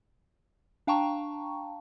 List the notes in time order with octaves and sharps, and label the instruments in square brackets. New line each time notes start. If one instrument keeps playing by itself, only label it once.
[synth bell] D4 F5 G5 A5 A#5 C#6